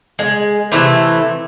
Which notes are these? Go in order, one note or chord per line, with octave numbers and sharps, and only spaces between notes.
G#3
C3 E3 A3